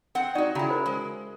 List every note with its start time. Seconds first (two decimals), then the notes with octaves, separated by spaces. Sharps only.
0.15 C4 F#5
0.35 D#4 F#4 D5
0.55 C#3 C#4 E4 F#4 A#5
0.69 A#4 C5 B5
0.86 G#3